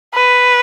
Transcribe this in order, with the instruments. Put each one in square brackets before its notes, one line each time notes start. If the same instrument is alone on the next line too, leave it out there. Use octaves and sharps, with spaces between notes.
[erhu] B4